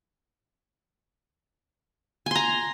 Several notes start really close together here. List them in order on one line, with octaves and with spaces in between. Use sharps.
G#5 C6 A#5